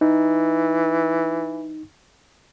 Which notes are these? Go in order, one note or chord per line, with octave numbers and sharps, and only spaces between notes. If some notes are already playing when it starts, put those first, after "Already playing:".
E3 D#4